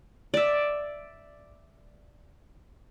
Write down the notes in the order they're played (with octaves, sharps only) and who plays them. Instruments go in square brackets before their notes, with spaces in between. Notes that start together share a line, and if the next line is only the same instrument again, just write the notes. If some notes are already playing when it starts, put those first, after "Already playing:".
[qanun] D5 E5